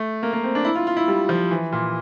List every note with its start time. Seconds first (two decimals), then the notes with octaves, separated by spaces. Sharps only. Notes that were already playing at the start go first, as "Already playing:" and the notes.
Already playing: A3
0.23 A#3
0.33 A#3
0.44 C4
0.55 D4
0.65 E4
0.75 F4
0.87 F4
0.97 E4
1.08 G3
1.29 F3
1.51 E3
1.72 A#2